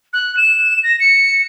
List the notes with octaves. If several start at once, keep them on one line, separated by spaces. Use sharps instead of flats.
F#6
E7
A#6
C#7